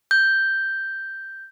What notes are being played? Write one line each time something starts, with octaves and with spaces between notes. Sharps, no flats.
G6